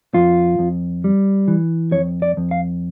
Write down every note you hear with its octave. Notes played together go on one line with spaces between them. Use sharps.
F2 F4
F2
G3
E3
F2 C#5
D5
F2
F5